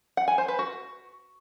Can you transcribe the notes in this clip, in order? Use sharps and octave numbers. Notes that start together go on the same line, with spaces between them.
F#5
G#5
C5
B4
F#4